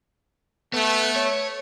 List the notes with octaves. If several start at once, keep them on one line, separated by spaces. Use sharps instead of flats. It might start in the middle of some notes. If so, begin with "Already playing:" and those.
A3 B3
C#5